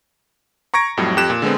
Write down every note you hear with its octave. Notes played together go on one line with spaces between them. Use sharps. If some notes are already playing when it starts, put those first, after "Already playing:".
A#5 C#6 G#6 A#6 D7
F2 A2 F#3 G3
F2 G4 F#6 E7
A#2
D3 G#3 B3 C4